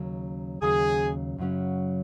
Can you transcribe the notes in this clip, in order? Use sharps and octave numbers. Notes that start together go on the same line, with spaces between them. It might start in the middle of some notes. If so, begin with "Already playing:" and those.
Already playing: D#2 C#3 F#3 C#4
D#2 C#3 F#3 C#4 G#4
F#2 C#3 F#3 C#4